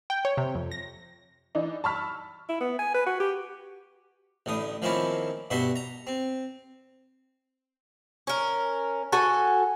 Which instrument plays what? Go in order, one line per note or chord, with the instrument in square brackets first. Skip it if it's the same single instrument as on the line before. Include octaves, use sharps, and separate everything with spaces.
[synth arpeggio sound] G5
C#5
C3
F2
A#6
[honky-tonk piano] E3 D4 D#4
A5 B5 C#6 E6 F6 B6
[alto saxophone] E4
B3
G#5
B4
F#4
G4
[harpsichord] A1 A2 D3 D#6
D#3 F3 A#3 C4 C#4 E4
G2 B2 F#4 E5 C6
A#5
C4
[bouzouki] C#4 A#4
F#4 A4 G#5